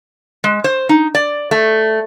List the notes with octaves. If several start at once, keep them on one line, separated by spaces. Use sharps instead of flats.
G#3
C5
D#4
D5
A3